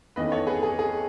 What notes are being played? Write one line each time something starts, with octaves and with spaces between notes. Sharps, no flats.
E2 D#3 A3 C#4 B4 D#5
A4 C#5
G#4 B4
G#4
G#4